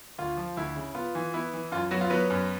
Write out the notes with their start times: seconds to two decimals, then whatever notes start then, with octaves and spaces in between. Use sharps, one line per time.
0.18 D2 F4
0.37 F3
0.57 D2 E4
0.76 C#3
0.95 B3 F4
1.15 E3
1.34 B3 E4
1.53 E3
1.72 F#2 F4
1.91 F#3 B3 F#4
2.01 F4
2.10 F#3 B3 B4
2.30 F#2